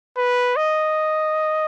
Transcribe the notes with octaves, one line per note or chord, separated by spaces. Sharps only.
B4
D#5